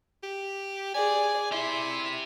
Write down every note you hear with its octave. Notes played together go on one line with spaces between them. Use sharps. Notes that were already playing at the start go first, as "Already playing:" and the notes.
G4
G#4 D5 G#5
E4 G4 E5 C6